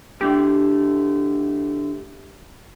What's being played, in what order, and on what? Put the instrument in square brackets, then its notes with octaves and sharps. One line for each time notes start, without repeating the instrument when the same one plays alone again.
[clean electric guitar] A2 D3 A3 [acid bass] G4